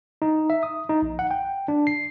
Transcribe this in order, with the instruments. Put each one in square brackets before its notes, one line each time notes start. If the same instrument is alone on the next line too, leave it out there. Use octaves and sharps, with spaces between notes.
[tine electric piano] D#4
E5
D#6
D#4
A#1
F#5
G5
D4
C7